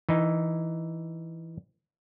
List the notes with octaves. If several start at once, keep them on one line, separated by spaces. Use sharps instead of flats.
E3 D#4